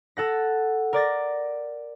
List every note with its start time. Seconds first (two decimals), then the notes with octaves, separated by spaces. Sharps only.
0.17 A4 F#5 A#6
0.93 A#4 D5 A6 A#6